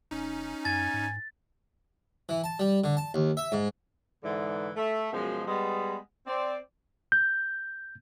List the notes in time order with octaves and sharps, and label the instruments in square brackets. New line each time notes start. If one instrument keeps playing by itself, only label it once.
[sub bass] F1 [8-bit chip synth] C#4 D#4
[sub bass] F#2 [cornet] G#5 [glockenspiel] A6
[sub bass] G#2
[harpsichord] E3
A5
G3
D3
A5
D#2
E5
G#2
[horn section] G#2 D3 E3
A3 E5
F#2 B2 F3 G#3
G3 G#3 B3
C4 D5
[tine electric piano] G6